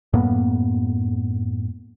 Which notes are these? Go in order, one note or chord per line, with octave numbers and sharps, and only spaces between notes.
F#2 A2 A#3 B3